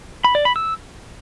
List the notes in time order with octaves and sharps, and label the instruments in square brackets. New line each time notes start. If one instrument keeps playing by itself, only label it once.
[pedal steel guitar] B5
D5
B5
E6